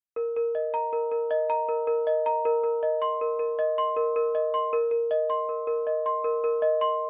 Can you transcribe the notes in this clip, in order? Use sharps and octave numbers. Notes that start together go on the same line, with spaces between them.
A#4
A#4
D#5
A#5
A#4
A#4
D#5
A#5
A#4
A#4
D#5
A#5
A#4
A#4
D#5
C6
A#4
A#4
D#5
C6
A#4
A#4
D#5
C6
A#4
A#4
D#5
C6
A#4
A#4
D#5
C6
A#4
A#4
D#5
C6